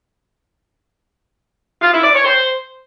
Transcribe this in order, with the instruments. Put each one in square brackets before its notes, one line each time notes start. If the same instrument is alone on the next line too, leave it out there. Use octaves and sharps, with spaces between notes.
[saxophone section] F4
E4
D5
C#5
C5